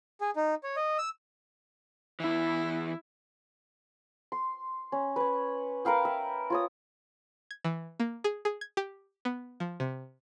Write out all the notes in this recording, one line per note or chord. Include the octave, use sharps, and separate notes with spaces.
G#4
D#4
C#5
D#5
E6
E2 E3 E4
C6
C#4
B4 C#5
A#4 B4 F5 G5
E5
F4 C#5 D#6
G#6
E3
A#3
G#4
G#4
G#6
G4
B3
F3
C3